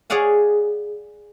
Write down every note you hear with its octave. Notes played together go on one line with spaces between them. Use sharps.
G#4 C#5 D5 F5 F#5 G#5